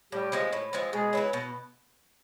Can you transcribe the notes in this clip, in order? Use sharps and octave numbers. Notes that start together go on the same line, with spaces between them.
A2 G3 G4
F3 G#3 C4
A2
F3 G#3 C4
B2 G#3 G#4
F#3 B3 E4
B2